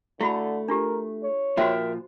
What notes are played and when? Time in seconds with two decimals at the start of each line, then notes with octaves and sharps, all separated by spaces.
0.21 D3 A3 E4 F#4 B5
0.68 D4 F4 G4 A#4
1.23 C#5
1.57 A#2 F3 F#4 A#4 C5 E5 G5 C6